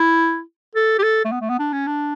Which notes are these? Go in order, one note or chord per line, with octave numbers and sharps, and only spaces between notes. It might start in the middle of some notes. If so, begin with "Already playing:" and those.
Already playing: E4
A4
G4
A4
A3
B3
A3
B3
D4
C#4
D4